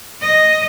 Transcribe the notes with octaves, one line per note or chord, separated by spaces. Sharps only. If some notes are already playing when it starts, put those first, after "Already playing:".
D#5